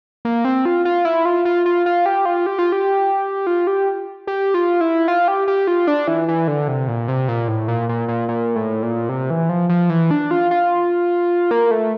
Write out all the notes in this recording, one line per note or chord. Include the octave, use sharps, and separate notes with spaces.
A#3
C4
F4
F4
E4
F4
F4
F4
F4
G4
F4
G4
F4
G4
F4
G4
G4
F4
E4
F4
G4
G4
F4
D4
E3
E3
D3
C3
A#2
C3
A#2
A2
A#2
A#2
A#2
A#2
A2
A#2
C3
E3
F3
F3
E3
D4
F4
F4
A#3
A3